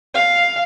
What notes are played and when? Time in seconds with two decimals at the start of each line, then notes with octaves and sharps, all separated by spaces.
0.15 F5